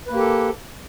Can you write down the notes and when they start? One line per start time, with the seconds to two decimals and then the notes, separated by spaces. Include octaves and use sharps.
0.07 B4
0.11 A#3
0.15 G4
0.19 A4